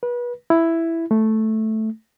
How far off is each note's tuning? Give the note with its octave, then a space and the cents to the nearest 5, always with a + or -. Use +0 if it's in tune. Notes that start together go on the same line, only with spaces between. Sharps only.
B4 -30
E4 +5
A3 -5